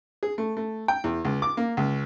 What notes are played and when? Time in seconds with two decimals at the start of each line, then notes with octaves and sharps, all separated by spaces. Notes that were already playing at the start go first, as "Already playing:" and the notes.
0.23 G#4
0.38 A3
0.57 A3
0.88 G5
1.04 E2
1.25 C#2
1.42 D6
1.57 A#3
1.77 C#2